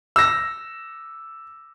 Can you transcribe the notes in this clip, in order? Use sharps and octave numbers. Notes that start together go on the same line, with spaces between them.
E6 A#6